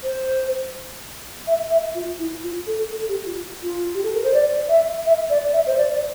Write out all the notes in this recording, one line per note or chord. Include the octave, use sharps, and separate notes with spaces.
C5
E5
E5
F4
E4
F4
A4
A4
G4
F4
F4
G4
A4
A#4
C5
D5
E5
E5
D5
E5
C5
D5